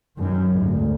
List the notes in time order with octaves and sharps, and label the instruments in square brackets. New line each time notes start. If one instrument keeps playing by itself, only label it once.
[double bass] F#2 D#3
G#1 D2